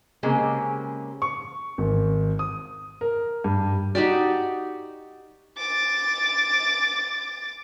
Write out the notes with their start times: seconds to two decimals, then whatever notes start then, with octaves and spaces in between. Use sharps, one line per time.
0.23 C#3 G#3 A#3 C4 C#4 G4
1.22 C#6
1.78 G#1
2.39 D#6
3.01 A#4
3.44 G2
3.95 D#4 F#4 G4 D5
5.57 D6 A6